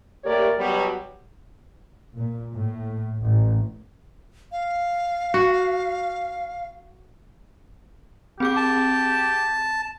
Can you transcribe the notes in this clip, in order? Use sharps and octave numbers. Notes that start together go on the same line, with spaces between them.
D#2 A3 G4 A#4 C#5 D5
B2 F#3 G3
A#2
A2
A1
F5
F#4
C4 G4 G#4 D6
A5